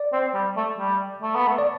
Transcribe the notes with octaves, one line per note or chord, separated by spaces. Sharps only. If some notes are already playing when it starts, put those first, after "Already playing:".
Already playing: D5
C4
G3
A3
G3
A3
B3
A3
D5